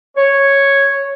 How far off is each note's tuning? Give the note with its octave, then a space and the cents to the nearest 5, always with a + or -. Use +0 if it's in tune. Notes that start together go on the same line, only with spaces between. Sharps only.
C#5 -5